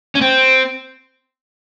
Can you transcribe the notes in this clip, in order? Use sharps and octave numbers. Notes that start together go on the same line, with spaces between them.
C#4
C4